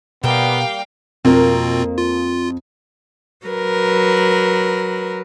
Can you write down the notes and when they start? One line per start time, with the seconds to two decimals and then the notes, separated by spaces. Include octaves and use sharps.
0.24 B2 G3 A#3 B3 F5 G5
1.25 F2 B2 A#3 C4 F4 A#4
1.98 F4
3.47 F#3 A#4 B4